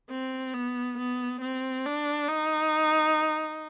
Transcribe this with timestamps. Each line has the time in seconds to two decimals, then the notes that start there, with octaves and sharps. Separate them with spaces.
0.10 C4
0.54 B3
0.98 B3
1.41 C4
1.86 D4
2.29 D#4